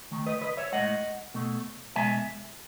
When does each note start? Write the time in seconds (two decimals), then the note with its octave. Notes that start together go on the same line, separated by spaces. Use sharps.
0.11 D#3 A3
0.26 B4 D#5
0.42 B4 D#5
0.57 C#5 E5
0.72 A2 G#3 D#5 F#5
1.34 B2 A3
1.96 B2 G#3 E5 G#5